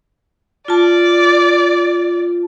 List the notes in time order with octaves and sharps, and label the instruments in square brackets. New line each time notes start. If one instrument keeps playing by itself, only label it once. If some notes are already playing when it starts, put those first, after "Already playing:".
[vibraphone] F4 A5 [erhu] D5